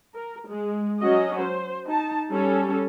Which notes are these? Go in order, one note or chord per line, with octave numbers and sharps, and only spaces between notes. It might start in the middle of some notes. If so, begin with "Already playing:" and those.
A#4
G#3
F#3 C#4 F#4 D#5
C5
D#4 A5
G3 C#4 A4